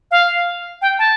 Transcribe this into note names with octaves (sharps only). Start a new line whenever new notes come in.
F5
G5
A5